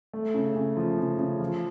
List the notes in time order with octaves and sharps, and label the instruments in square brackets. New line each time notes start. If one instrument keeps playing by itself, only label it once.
[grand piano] A3
C#3
C#3
F3
C#3
C#3
F3